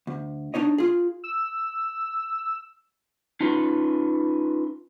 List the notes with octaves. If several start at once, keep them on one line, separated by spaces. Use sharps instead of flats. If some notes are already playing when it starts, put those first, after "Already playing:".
D2
D4 D#4 C#5 D#5
F4 G#4
E6
C#4 D#4 F4 B4